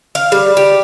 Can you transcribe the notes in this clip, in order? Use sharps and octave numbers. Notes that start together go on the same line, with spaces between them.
F5
G3
G4